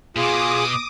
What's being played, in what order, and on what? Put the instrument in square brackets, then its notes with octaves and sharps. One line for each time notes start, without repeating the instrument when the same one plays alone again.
[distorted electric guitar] B2 [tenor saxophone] F4 [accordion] G#4 [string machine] D6 D#6